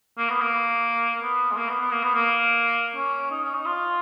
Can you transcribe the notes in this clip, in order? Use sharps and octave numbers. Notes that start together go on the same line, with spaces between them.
A#3
B3
A#3
B3
G#3
A#3
B3
B3
A#3
B3
A#3
C#4
D#4
C#4
D#4
F4